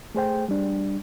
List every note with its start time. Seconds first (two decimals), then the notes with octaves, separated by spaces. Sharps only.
0.15 A3 G#4 C5 G5
0.49 G3 D4